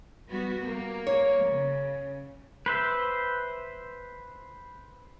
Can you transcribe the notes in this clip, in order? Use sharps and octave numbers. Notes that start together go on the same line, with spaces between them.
G3 B3 F#4
A#3
C#5
C#3
B4 C5 E5